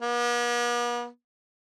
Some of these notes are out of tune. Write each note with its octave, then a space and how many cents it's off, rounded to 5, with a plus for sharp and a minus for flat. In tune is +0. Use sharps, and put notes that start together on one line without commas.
B3 -45